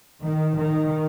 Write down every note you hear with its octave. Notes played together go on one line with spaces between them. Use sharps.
D#3
D#3